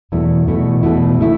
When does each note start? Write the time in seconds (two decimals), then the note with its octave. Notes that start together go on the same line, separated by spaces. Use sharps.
0.12 E2 B2 A3 E4
0.47 E2 B2 A3 E4
0.83 E2 B2 A3 E4
1.19 B2 A3 E4